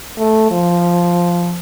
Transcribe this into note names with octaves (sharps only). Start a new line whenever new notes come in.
A3
F3